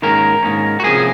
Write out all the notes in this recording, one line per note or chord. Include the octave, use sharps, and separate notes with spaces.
G#2 D#3 A#3 C#4 A#4
G#2 D#3 A#3 C#4
F#4
C3 F3 A#3 C#4 G#4